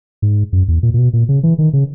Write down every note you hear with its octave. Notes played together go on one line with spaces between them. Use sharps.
G#2
F#2
E2
A#2
A#2
B2
A#2
C#3
E3
D#3
C#3